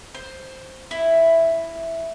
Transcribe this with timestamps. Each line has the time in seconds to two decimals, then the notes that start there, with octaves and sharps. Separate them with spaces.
0.15 C5
0.91 E4